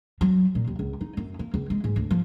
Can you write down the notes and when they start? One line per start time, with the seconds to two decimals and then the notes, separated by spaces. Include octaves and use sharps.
0.21 F#3
0.55 A#2
0.67 D#2
0.79 C#2
1.01 D#4
1.17 F#2
1.39 A#3
1.54 C#2
1.70 G#3
1.84 G#2
1.96 D2
2.11 F3